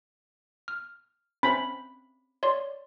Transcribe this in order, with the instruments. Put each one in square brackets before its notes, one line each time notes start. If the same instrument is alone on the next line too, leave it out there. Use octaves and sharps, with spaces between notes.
[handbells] F6
[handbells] C4 C#4 C5 [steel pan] B5
[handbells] C#5 D5 C6